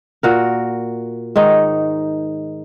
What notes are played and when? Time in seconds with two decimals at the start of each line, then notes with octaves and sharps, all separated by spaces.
0.23 A#2 F#4 A#4
1.36 G#2 D#3 D#4